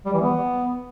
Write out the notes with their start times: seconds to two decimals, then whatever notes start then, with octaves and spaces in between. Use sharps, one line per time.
0.06 G3
0.13 E3
0.21 B3